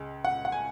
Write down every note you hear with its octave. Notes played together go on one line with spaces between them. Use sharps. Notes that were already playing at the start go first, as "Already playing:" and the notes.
Already playing: C#2 C#3 G#3
F#5
F#5
G#5